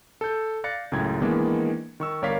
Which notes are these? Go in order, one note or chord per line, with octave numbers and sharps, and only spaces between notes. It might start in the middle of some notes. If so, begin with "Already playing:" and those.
A4 G6
D5 F5 F#6 A6 A#6 C#7
C#2 F#2 A2 G5 G#6
D#3 E3 G#3 A#3 B3 D4
D#3 C#6 E6
G1 A#4 C#5 D5 F5 B6